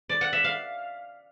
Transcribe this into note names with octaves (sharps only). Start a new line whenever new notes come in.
D5
F#5
E5
F5